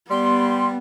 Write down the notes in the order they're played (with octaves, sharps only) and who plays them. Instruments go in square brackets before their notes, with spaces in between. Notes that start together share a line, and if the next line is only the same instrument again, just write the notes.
[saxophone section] G3 [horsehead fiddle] B3 [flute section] C6